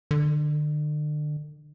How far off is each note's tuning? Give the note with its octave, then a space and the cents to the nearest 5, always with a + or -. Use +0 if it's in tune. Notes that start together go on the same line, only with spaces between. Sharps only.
D3 +35